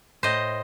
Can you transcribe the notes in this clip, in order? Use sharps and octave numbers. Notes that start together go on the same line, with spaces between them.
A2 C5 D#5